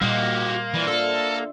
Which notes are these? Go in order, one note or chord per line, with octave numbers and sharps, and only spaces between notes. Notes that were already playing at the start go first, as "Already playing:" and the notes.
A#2 G3 A#3 F#4 G4 C5 D#5 F5
E3 F4 D5
D3 A4 E5